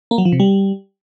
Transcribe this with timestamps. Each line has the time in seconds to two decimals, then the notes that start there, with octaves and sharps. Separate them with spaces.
0.11 A#3
0.18 F#3
0.25 F3
0.32 C3
0.40 G3